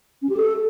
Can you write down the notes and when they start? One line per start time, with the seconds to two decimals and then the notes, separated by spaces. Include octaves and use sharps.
0.22 C#4
0.29 G4
0.37 A4